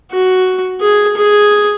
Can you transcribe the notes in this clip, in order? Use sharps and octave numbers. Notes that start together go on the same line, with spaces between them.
F#4
G#4
G#4